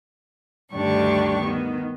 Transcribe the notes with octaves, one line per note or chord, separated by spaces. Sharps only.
D2 G2 D#3 D4 G4 C#6
D#3 B3